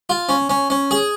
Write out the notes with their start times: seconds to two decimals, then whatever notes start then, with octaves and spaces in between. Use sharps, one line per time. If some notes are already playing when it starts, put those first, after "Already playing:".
0.10 F4
0.29 C#4
0.50 C#4
0.70 C#4
0.91 G#4